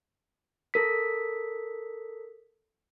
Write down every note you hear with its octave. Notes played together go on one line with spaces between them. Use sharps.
A4 A#4 B6